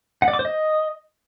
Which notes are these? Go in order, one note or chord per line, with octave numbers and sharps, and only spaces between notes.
F#5
D5
D6
C5
D#5